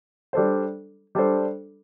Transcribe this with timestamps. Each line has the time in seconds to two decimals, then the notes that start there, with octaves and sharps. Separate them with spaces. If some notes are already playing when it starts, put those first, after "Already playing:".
0.33 G3 D4 A4 C5
1.15 G3 D4 A4 C5